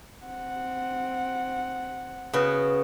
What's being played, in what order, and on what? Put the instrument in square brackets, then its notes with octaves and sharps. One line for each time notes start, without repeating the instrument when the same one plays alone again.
[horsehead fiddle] C4 F#5
[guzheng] C#3 B3 F#4